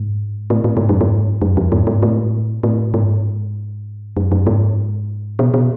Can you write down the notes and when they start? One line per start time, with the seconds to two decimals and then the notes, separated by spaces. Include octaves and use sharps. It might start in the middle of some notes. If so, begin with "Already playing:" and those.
Already playing: G#2
0.50 A2
0.64 A2
0.77 G#2
0.89 F#2
1.01 G#2
1.42 F#2
1.57 F2
1.72 G#2
1.87 G#2
2.03 A2
2.63 A2
2.94 G#2
4.17 F#2
4.32 F#2
4.47 G#2
5.39 B2
5.54 B2